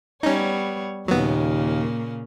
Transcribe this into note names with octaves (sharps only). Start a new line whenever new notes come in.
G3 B3 C#4 D#4 C#5
D#2 A#2 C#3 F#3 A#3 B3